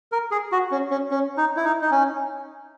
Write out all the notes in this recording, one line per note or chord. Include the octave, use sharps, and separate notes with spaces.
A#4
G#4
F#4
C#4
C#4
C#4
D#4
E4
D#4
D#4
C#4